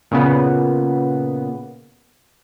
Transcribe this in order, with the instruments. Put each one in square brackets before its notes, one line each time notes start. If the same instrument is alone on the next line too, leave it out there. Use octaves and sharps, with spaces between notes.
[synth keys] A#2 C#3 B3